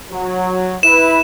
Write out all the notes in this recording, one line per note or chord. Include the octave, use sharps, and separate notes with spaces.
F#3
E4 B4 E7